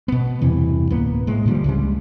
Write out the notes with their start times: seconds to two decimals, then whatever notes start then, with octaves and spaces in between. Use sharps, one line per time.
0.08 B2 B3
0.42 E2 G2 C3 E3
0.90 D1 A#3 B3
1.27 A2 G#3
1.46 A#2 D3 F3 G3
1.64 C#2 C#3 G3 G#3